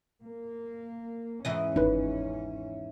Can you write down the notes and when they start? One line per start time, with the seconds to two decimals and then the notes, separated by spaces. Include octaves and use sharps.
0.23 A#3
1.45 E2 G#2 E3 C#4 D#5
1.76 G1 D#4 B4